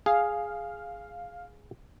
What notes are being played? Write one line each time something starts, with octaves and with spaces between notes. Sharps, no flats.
G#4 F5